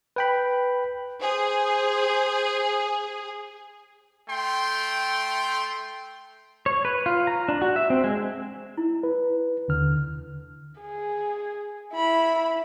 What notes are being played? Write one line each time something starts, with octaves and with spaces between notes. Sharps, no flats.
B4 G5 B5
G#4 C5
A3 G5 C6
C#5
B4
F4
A#5
D4
F#4
E5
C4
G#3
E4
B4
D#2 D3 F6
G#4
E4 B5